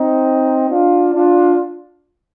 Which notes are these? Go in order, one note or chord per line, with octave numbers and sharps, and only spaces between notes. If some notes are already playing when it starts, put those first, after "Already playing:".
Already playing: C4 D#4
D4 F4
D4 F4